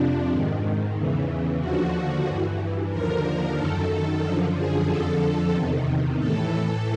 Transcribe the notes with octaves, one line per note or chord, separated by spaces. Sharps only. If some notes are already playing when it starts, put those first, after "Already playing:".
Already playing: F2 C3 F3 D4
G#2 D#3
E2 C#3 E3
D#2 D3 F3 F#4
G2 E3
D#2 D3 F3 A#4
F#2 D#3 A4
F#2 D3 F3 A4
G#4
F2 D3 F3 A4
E2 C3 D#3
A2 E3 A4